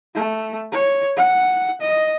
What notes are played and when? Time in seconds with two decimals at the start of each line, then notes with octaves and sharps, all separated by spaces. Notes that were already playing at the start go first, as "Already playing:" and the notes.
0.15 A3
0.72 C#5
1.17 F#5
1.81 D#5